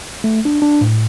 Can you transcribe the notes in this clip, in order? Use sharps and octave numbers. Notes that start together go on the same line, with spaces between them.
A3
D4
D4
A2